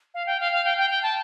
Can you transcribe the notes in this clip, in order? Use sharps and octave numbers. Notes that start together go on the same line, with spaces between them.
F5
G5
F5
F5
G5
G5
G5
A5